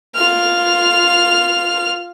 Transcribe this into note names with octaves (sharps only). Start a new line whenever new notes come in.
F4 F6